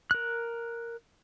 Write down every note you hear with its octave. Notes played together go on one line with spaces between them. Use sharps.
A#4 F#6